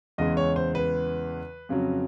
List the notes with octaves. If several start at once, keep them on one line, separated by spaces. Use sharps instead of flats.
E2 C#3 E3 G#3 D#5
C#5
C5
B4
F2 C#3 F#3